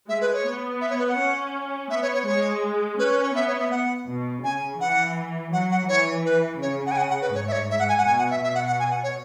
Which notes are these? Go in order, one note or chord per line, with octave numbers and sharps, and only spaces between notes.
G#3 E5
B4
C#5
B3
E5
C#5
B4
F#5
C#4
B3 E5
C#5
C#5
G#3 C#5
C#4 B4
B4
C#5
B3 E5
C#5
E5
F#5
B2
C#3 G#5
E3 F#5
F#3 F#5
F#5
E3 C#5
B4
C#3 C#5
F#5
G#5
F#5
F#5
B4
G#2 C#5
E5
C#5
E5
F#5
G#5
F#5
B2 G#5
F#5
E5
B2 E5
F#5
F#5
G#5
F#5
C#5